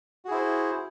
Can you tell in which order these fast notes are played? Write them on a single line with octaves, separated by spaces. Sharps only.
F#4 G#4 E4 C5